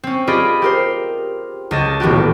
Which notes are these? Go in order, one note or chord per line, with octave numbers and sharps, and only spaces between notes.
C4 C#4
F4 G4 G#4 D5 D#5 B5
G4 A#4 C5
C#2 D#5 A5
D#1 A1 B3 F#4 G4